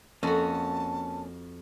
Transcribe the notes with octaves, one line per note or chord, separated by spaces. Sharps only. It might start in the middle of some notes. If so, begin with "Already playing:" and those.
F2 A#3 C#4 F#4 A5